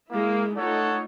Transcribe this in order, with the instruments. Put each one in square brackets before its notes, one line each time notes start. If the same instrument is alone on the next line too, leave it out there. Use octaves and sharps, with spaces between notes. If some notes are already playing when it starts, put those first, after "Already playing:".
[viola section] G#3 E4 [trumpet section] A#3
[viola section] A3 D#4 F4 [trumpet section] A4 C#5 F#5